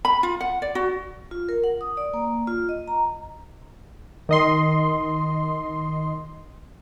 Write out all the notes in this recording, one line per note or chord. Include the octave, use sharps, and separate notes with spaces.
B5
F4
F#5
D5
F#4
F4
A#4
F#5
D#6
D5
A#3
F4
D#5
A#5
D#3 D#5 C6